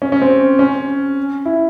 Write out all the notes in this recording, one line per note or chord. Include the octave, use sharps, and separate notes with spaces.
C#4
C#4
C4
C#4
E4